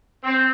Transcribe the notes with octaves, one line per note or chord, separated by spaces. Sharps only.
C4